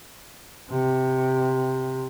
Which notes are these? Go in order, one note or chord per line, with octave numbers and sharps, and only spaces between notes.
C3